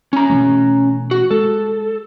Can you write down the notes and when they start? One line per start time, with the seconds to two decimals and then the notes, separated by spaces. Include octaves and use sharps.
0.13 C#4 A#5
0.30 B2 E3 A3
1.11 F#4
1.31 G#3 A4